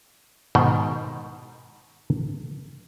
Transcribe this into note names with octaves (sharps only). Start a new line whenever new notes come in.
G#2 B2 D#3